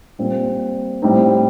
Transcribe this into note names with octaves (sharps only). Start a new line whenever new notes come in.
A#2 G3 C4
A2 G3 C4 D#4